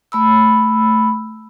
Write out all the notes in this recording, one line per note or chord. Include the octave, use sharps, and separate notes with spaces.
A3 B5 E6